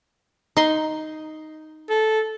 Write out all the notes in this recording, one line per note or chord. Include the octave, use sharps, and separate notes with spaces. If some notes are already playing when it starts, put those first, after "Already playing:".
D#4 C6
A4